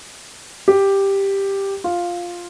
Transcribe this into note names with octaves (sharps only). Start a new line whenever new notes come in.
G4
F4